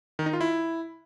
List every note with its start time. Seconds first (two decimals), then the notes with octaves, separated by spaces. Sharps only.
0.19 D#3
0.26 D#4
0.33 F4
0.41 E4